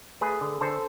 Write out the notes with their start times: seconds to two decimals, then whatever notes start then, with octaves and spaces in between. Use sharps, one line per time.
0.21 A3 G#4 B4
0.41 D3
0.61 D3 A4 C5